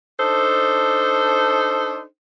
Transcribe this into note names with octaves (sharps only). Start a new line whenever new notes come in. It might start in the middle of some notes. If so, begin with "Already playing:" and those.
D4 D#4 A4 C5